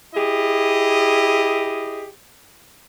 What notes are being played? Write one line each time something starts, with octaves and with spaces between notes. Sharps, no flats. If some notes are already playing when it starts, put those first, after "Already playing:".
E4 G4 G#4 D#5